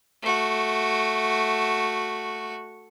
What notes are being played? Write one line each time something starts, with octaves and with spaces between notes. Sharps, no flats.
A3 F#4